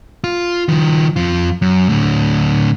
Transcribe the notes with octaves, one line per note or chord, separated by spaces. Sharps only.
F4
D#3 F3
F2 F4
F#2
A2 D3